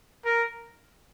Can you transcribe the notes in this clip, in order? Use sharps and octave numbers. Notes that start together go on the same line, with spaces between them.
A#4